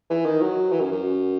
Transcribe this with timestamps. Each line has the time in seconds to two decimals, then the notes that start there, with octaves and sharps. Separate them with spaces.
0.10 E3
0.25 D#3
0.42 F#3
0.71 E3
0.81 F#2
0.92 F#2